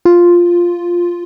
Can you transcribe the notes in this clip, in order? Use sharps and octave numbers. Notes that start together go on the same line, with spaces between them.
F4